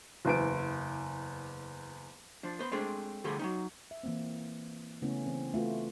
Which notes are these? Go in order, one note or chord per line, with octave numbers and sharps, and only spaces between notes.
F#1 E2 D7
F3 D4
B3 C5
G#3 A3 C4 D4 G#4
D3 F3 G3 A3 G#4 C6
F#3 C#4 D#4
E5
E3 A#3 C4
C#3 A3 B3 C#4 E4
E3 C4
A3 F4 F#4 B4